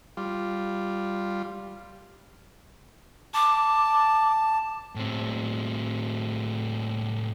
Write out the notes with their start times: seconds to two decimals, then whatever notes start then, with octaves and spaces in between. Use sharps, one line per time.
0.17 G3 F4
3.34 A5 D6
4.95 A2 C4